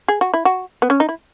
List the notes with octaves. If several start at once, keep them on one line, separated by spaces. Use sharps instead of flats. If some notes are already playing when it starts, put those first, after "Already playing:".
G#4
F#4
E4
F#4
B3
C#4
D#4
E4